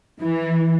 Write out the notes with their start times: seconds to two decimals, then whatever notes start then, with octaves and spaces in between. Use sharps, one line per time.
0.21 E3